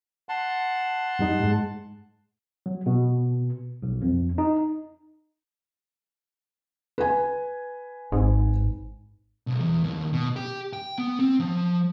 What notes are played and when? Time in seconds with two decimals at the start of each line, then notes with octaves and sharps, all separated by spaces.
0.29 F#5 A5 C6
1.19 F#2 G3 D#4
1.40 G#2 G#3
2.66 F#3
2.86 B2
3.83 B1
4.02 F2
4.38 D#4
6.98 B4 G#5
8.12 G#1 G#2
9.47 B1
9.60 E2
9.84 D#2
10.13 B2
10.36 G4
10.73 G5
10.98 B3
11.19 C4
11.40 F3